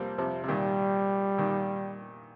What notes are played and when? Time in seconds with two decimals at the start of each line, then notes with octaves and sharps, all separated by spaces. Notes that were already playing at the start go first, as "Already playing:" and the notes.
Already playing: C3 F3 G3 A#3 C4
0.18 C3 F3
0.43 C3
0.48 A#2 D#3 G3
1.38 A#2 D#3